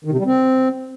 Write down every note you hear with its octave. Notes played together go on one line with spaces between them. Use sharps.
D#3
C3
G3
C4